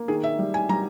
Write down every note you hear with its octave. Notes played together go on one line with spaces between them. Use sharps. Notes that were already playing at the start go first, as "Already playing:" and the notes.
Already playing: A#3
D#3 G#4
E5
G3
G#5
G3 A#5